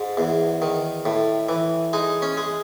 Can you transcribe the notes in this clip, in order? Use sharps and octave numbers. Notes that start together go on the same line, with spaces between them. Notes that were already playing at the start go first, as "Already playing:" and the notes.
Already playing: G#2
E2
D#3
A2
E3
G#3 D#4
C#4
G#3